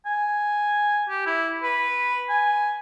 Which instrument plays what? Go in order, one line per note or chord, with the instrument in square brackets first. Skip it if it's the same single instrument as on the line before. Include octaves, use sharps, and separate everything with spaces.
[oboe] G#5
G4
E4
B4
G#5